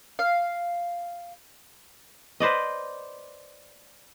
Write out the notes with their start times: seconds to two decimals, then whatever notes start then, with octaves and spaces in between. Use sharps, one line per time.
0.19 F5
2.40 B4 C5 D5 D#5